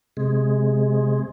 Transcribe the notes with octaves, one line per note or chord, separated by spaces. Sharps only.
C3 G#3